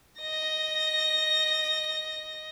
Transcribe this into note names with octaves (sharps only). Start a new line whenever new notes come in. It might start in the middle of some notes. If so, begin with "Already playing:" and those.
D#5 A#6